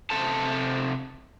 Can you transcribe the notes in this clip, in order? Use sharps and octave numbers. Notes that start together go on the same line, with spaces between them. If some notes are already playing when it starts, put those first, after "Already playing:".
C3 A4 C5 A5